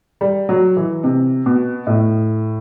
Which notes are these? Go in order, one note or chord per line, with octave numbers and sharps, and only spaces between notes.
G3
F#3
E3
C3
B2
A2